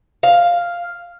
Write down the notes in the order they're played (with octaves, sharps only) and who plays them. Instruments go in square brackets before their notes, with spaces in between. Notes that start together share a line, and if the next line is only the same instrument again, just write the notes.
[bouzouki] F5